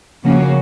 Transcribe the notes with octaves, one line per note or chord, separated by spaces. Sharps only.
C#3 F3 A#3 C#4 F#4